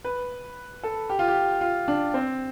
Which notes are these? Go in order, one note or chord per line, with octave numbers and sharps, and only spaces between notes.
B4
A4
G4
F4
G4
F4
D4
C4